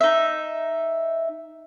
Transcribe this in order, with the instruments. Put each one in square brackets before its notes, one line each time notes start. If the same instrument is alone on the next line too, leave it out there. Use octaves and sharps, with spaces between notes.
[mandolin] D#4 E5